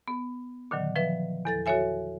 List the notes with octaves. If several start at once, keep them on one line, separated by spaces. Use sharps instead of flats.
B3
A#2 D3 D#3 F#3
F3 B4 E5
E2 A4 A6
F#4 A4 C#5 E5 G#5